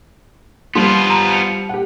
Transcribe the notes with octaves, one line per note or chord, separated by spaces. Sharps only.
F3 G3 B3 F4 C6
A#5
C#7 F7
G4 F#5